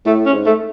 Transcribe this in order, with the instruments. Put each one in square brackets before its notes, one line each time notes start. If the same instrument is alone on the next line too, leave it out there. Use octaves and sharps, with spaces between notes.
[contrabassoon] A2 [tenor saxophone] A3
[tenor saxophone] C#4
[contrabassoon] G#2
[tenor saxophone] A3